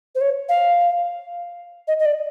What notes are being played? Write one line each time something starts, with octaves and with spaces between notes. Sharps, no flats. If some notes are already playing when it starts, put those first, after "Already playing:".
C5
C#5
F5
D#5
D#5
D5